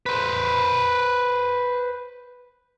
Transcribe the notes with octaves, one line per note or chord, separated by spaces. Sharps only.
B4 C5